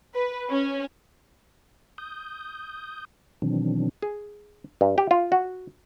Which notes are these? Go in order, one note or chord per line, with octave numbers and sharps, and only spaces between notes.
B4
C#4
D#6 G6
B2 D#3 E3 F#3 C4 D4
G#4
G2
G4
F4
F#4